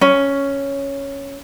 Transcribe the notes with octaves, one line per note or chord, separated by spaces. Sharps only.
C#4